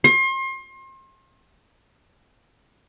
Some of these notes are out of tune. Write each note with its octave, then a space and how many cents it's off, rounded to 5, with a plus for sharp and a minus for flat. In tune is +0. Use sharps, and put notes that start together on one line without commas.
C6 +35